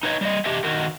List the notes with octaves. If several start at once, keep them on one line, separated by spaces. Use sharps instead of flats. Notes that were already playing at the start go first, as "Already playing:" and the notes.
D#4 B4 C#5 D#5
G3 D#5
D4 G4 D#5 E5
D#3 F#4 A#4